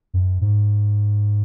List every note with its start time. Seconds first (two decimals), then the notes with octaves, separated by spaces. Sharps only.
0.14 F#2
0.41 G#2